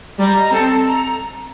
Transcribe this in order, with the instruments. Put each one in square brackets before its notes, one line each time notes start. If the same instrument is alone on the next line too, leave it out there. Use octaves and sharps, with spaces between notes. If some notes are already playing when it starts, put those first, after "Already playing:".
[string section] G3 [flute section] A#5
[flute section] D#5
[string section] C4 [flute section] A4
[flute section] A4
A#5